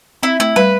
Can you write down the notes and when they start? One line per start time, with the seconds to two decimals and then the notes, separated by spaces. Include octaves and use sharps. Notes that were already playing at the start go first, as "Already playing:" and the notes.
0.23 C4 E4
0.40 A3 E4
0.56 G3 B4